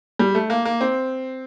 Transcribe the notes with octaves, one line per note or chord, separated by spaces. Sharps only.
G3
A3
A#3
A#3
C4